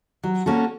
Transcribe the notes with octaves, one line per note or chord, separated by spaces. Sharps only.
F#3
A#3 C#4 F#4 A4